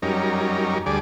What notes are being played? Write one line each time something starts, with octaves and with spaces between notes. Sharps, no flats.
F#2 G3 C#4 D#4 A#4
D2 G3 G#4 D5